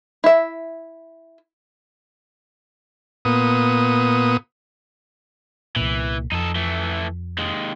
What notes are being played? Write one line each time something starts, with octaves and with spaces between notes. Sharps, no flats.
E4 E5
A#2 B3 D#6
C2 A#2 E3
F2 D#4 A4
E3 A3
D#2 G#3